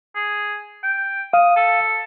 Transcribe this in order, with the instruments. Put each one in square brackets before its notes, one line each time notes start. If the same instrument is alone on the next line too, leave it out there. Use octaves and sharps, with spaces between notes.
[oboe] G#4
G5
[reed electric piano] F5 [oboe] D#6
[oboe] A4